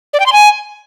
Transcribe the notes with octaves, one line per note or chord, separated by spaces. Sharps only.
D5
G5
C6
G#5